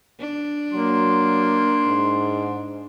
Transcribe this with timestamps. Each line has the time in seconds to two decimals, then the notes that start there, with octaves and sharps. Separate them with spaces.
0.19 D4
0.73 F#3 A#3 C6
1.86 G#2